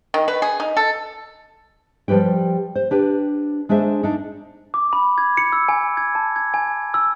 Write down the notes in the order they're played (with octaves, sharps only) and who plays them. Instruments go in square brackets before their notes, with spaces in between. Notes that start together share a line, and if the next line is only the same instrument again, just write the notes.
[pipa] D#3
B4
G#4
D#4
A4
[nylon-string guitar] F3 G3 G4 B4 G5
C5
D4 G4 B4
G#3 D4 G#4 C5 E5
D4 D#4
[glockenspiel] D6
B5
G#6
C#7
E6
G#5
G#6
A5
G#6
G#5
E6